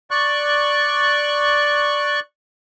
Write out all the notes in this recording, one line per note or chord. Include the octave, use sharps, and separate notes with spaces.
D5 C#6 F#6